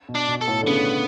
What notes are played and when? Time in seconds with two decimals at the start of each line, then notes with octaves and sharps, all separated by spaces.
0.09 B2
0.15 D4
0.28 B2
0.41 A4
0.48 A2
0.63 D3
0.67 C#3 B3